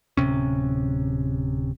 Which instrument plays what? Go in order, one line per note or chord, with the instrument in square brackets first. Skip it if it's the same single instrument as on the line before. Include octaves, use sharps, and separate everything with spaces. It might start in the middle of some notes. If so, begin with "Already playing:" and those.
[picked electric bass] D1 B1 C3 C#4